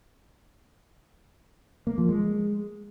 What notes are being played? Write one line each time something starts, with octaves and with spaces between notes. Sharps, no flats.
A#3
F3
G#3